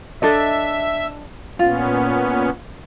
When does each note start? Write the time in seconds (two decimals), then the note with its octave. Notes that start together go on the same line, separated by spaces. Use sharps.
0.22 D4 A4 D#5 E5
1.59 A#2 B3 C#4 F4